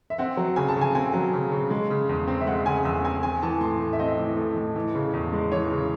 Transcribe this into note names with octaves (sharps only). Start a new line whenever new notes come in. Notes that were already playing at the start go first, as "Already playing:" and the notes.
E5
C4 F#5
F#3
C#3 G#5
A5
C#3
G#5
C4 G#5
F#3
C#3
C#3
G#3
C#3
E2
C4
E5
G#3 F#5
C#3 G#5
E2 E6
C4 G#5
C4 G#5
E3 A5
A2 C6
A2
E5
C4 D#5
E3
A2
A2
E3
C#3
E2
G#3
E3 C#5
C#3